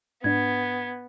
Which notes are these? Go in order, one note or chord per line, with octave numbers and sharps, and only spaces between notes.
G#2 B3 D4 G#6